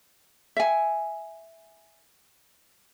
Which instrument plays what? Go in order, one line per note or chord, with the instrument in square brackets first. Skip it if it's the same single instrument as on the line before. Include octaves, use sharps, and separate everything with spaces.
[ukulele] E5 G#5